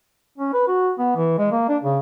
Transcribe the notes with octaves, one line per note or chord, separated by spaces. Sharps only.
C#4
B4
F#4
B3
E3
G#3
A#3
D4
C#3